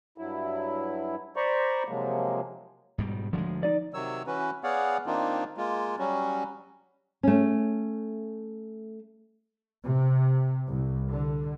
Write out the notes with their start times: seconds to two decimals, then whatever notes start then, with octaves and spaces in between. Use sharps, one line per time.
0.18 G2 F#3 E4
1.36 C5 D5 A#5 B5 C#6
1.88 C3 F3 F#3 G#3 A#3
2.98 G#2 B2 G3
3.33 D2 F3 G3 G#3
3.63 D#4 D5
3.94 C3 D#3 F#3 C#5 E6
4.27 E3 C#4 F#4 B4
4.64 B3 G#4 C#5 D5 F5 F#5
5.06 D#3 A#3 C4 D4 D#4 F4
5.57 G#3 A#3 F4
5.99 F#3 G3 C#4 F#4
7.23 A3 C#4
9.83 C3
10.68 C2
11.11 D3